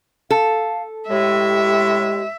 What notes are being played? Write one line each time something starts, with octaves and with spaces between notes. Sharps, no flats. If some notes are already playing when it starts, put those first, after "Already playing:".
A4 F5
A2 G#3 G4 E5